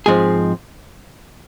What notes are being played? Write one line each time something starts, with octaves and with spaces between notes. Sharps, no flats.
G#2 F3 G#3 C4 G#4